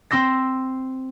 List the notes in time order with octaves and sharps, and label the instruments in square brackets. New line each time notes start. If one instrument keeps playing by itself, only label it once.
[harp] C4 C6 E6 A#6